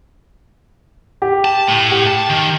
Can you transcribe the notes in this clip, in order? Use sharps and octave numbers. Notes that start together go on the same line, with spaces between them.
G4
A5
A2
G4
A5
D#3